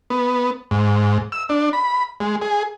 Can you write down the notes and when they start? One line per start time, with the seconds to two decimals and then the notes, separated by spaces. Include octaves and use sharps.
0.10 B3
0.71 G#2
1.32 E6
1.49 D4
1.73 B5
2.20 G#3
2.41 G#4